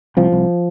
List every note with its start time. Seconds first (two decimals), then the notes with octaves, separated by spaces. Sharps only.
0.17 C2 F3
0.32 C2